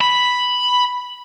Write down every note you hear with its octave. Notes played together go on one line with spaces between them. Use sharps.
B5